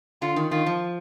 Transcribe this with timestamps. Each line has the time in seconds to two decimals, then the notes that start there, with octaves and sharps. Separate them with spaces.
0.22 D3 F4
0.36 D#3
0.51 D#3 F4
0.66 F3